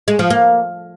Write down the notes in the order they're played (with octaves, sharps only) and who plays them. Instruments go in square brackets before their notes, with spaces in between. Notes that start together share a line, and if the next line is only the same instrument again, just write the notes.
[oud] G#3
F3
A#3